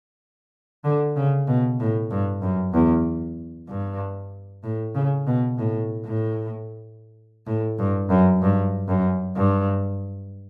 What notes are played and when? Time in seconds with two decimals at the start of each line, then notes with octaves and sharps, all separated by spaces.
0.84 D3
1.16 C#3
1.47 B2
1.80 A2
2.11 G2
2.42 F#2
2.74 E2
3.68 G2
4.63 A2
4.95 C#3
5.27 B2
5.58 A2
6.05 A2
7.46 A2
7.78 G2
8.10 F#2
8.42 G2
8.88 F#2
9.36 G2